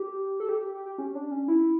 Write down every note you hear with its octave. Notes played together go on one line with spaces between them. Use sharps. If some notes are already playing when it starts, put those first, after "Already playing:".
Already playing: G4
A4
G4
G4
G4
G4
C#4
D4
C#4
E4